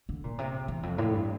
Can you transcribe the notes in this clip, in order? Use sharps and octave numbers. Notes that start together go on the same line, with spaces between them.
D3
A#2
C3
E2
F2
A2
G2